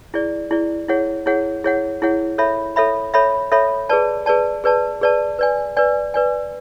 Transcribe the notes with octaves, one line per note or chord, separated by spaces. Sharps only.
E4 G#4 D5
E4 G#4 D5
E4 G#4 C#5 F#5
E4 G#4 C#5 F#5
E4 G#4 C#5 F#5
E4 G#4 C#5 F#5
A4 C#5 E5 B5
A4 C#5 E5 B5
A4 C#5 E5 B5
A4 C#5 E5 B5
G#4 B4 D5 A5
G#4 B4 D5 A5
G#4 B4 D5 A5
G#4 B4 D5 A5
B4 D5 G#5
B4 D5 G#5
B4 D5 G#5